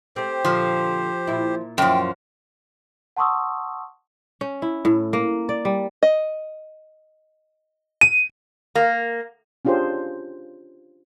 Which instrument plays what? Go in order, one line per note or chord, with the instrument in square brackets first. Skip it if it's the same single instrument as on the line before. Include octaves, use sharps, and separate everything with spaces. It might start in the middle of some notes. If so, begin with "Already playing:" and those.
[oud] A3 C4 [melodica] G4 C5
[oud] A#2 D3 [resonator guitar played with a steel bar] F3
[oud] A#2 E4
[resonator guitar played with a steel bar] F#2 F3 [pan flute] G5
[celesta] F#5 A5 C6 C#6 D#6 E6
[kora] C#4
E4
A2
A#3
D5
G3
[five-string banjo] D#5
[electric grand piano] D#7
[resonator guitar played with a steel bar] A#3
[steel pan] C#4 D4 F4 G4 G#4 C5